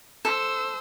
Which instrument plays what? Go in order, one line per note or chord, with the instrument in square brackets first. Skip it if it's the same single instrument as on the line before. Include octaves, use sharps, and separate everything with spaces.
[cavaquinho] A4 [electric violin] C5 E6